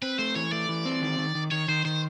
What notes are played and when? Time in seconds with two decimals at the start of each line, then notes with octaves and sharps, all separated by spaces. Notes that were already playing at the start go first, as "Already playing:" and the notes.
0.02 C4 B4
0.19 A3 C5
0.35 E3 C#5
0.52 A3 D5
0.69 E3
0.85 C4
1.02 D#3
1.18 D#3
1.35 D#3
1.51 D#3 C#5
1.68 D#3 C5
1.85 D#3 C5